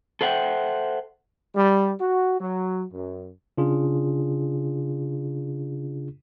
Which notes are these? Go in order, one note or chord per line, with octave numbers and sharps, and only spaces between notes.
A4 C5 E5 F#5 G5
G3
F#4
F#3
F#2
C#3 D4 F4 G#4